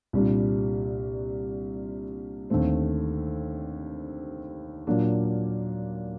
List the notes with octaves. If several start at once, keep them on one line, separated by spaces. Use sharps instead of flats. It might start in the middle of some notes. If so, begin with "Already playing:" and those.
C2 A#2 G3 D4
D#2 D3 A3 C4
A#2 F#3 A#3 D4